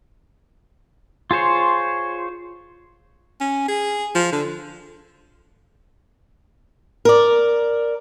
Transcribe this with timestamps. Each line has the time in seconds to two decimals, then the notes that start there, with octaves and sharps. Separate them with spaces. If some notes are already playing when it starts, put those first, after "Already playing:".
1.31 F4 G#4 C5 C#5
3.41 C#4
3.68 G#4
4.15 F3
4.32 D3
7.05 A#4 D5